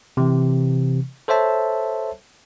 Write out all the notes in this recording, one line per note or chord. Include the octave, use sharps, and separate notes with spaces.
C3 E3
A4 C5 C#5 E5 A5